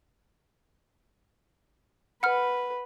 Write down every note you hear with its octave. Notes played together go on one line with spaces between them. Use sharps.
B4 F#5 B5 F6